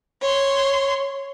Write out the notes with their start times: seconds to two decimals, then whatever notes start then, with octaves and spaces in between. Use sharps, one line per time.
0.21 C#5 C6